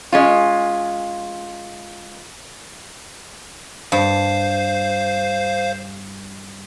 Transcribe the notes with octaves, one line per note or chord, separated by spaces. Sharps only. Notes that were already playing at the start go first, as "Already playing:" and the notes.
G#3 C#4 F4
G2 C5 F5